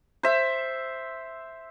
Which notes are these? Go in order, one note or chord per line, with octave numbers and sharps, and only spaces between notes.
C5 E5